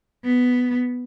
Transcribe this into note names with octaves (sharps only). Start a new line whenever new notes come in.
B3